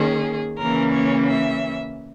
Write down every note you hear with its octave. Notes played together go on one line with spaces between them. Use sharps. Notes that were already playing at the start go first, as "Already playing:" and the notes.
Already playing: D#3 A#3 C#4 G#4
C#3 E3 A#3 C#4 A#4
C#5
E5